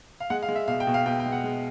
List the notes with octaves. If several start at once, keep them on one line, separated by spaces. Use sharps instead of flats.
F5
G#3 F#5
F5
G#3
E5
B2 F5
G5
B2
F5
B2 G5
G5
G#3
F#5
G#3